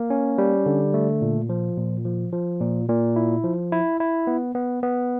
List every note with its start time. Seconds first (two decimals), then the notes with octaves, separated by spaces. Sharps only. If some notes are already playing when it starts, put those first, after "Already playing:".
Already playing: A#3
0.10 C#4
0.38 G3
0.66 D3
0.94 A3
1.21 A#2
1.49 F3
1.77 A#2
2.05 F3
2.33 F3
2.61 A#2
2.89 A#2
3.16 E4
3.43 F3
3.72 E4
4.00 E4
4.27 B3
4.55 B3
4.83 B3